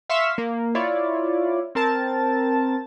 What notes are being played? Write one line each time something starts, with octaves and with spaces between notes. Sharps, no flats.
E5 F5 C6 C#6 B6 E7
A#3
E4 F4 C#5 D5
C4 A#4 A5 A6